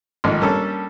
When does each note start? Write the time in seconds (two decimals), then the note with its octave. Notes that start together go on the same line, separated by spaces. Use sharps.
0.24 A1 G#2 D#3 F3
0.42 G3 A#3 C#4 D4 A4